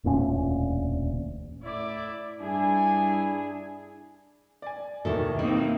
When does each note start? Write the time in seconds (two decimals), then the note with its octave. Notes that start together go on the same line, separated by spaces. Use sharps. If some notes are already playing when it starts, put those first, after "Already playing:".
0.04 E1 D2 A#2 C#4
1.63 A2 E4 D5 D6
2.40 G2 D4 E4 G#4 G#5
4.62 D5 G#5
5.05 D#2 B2 D#3 E4 A4
5.39 A#3 C4 D#4 E4